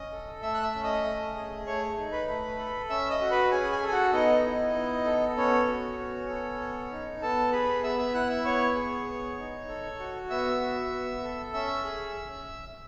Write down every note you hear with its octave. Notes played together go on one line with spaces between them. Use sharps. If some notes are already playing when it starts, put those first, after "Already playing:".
Already playing: C#4 D#5 D#6
A4
A3 E5 E6
F#6
E5 E6
C#4
D#5 D#6
A3
G#4
A3 C#5 C#6
D#4
B4 B5
A3
A4
C#4 E5 E6
D#5 D#6
F#4
B4 B5
C#4 G#4 G#5
G#4 G#5
A4
G#5
F#4 F#5
B3 D#4 D#5
E4
B3
A4
B3 C#4 C#5
F#4
B3
A4
B3
D#4
B3 A4 A5
G#4 B4 B5
B3 E5 E6
E5 E6
E4 F#5 F#6
E5 E6
B3 C#5 C#6
G#4
B3
D#4
A4
F#4
B3 E5 E6
F#4
B3
A4
C#4 E5 E6
G#4